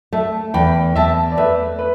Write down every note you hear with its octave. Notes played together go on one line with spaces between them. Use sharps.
A3 E5 A5
E2 G5 B5
E2 E5 A5
D5
A3 B4 E5
B4